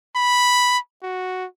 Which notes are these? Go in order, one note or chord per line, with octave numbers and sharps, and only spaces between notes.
B5
F#4